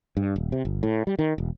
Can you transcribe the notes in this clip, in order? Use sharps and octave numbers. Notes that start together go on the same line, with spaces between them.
G2
D#1
C3
G1
A2
G3
D#3
E1